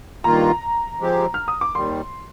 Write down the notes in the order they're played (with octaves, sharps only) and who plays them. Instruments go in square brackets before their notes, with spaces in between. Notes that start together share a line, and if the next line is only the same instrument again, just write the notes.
[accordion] G2 D#3 A#3 F4 [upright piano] A#5
[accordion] F3 G#3 C4 G4
[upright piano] F6
D#6
D6
[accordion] D#2 D#3 G3 [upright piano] C6